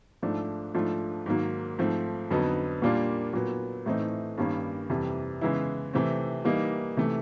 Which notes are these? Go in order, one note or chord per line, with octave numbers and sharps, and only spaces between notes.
G#2 F3 A3 D4
G#2 F3 A3 D4 F4
G#2 D#3 F#3 A#3
G#2 F3 A3 C4
F2 D3 F#3 B3 D#4
A#2 G3 A#3 D4 F4
A#2 F#3 B3
A2 E3 A3 C4 D#4
G2 D#3 G3 A#3 C#4
F2 C3 E3 G3
C#3 E3 G#3 B3 E4
C3 E3 A3 C4
E3 G3 A#3 D#4
C3 E3 A3